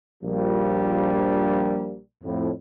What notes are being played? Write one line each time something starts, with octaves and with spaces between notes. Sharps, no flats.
A#1 F3 G3 A#3
F2 A2